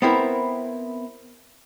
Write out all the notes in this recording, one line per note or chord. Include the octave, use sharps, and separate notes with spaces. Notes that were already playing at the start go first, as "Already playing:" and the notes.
B3 C4 E4 A#4